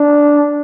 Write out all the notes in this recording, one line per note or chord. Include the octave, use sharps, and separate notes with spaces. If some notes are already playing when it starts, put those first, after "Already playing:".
Already playing: D4